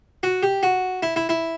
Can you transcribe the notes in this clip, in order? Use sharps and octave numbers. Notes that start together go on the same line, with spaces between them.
F#4
G4
F#4
E4
E4
E4